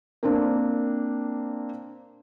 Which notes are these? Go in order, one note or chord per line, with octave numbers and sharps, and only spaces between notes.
A#3 C4 D4